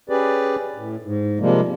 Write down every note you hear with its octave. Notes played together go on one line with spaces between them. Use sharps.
C#4 G4 G#4 B4 D5
A2
G#2
C3 F3 G3 G#3 A#3